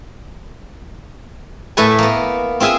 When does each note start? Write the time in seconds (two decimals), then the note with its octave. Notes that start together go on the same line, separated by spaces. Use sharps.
1.77 A2 A3 A4 B4 G#5
1.98 A#3 B3
2.60 C4 F4 G#4 E5 G#5